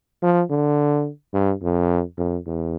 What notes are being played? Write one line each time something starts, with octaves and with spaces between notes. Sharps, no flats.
F3
D3
G2
F2
F2
E2